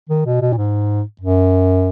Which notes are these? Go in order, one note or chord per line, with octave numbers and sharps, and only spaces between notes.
D#3
B2
B2
A#2
G#2
F#2